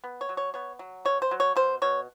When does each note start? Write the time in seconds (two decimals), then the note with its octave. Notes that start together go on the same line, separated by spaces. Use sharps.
0.04 B3
0.21 C#5
0.29 F#3
0.37 C#5
0.54 B3 C#5
0.79 F#3
1.05 B2 C#5
1.22 C5
1.31 F#3
1.40 C#5
1.56 B2 C5
1.82 B2 C#5